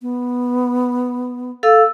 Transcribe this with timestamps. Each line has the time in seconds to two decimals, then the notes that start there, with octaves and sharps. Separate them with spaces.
0.02 B3
1.63 A4 F5 E6